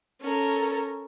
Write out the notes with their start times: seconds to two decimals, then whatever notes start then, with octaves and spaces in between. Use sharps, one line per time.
0.21 C#4 A4 A#4